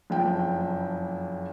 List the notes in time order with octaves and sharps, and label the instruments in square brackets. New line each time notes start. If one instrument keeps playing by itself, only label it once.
[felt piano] F#1 F2 G5